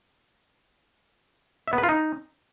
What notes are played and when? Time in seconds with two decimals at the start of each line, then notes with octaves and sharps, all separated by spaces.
1.68 E5
1.73 B3
1.78 B4
1.83 F4
1.89 D#4